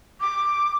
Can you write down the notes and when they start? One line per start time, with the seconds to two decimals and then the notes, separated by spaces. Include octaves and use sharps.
0.21 D6